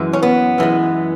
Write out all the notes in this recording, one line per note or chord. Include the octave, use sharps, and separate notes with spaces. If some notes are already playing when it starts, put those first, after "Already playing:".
Already playing: F#2 E3 G#3
C#4
B3
F#2 E3 G#3